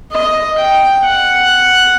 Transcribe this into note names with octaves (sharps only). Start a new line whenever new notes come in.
D#5
G5
F#5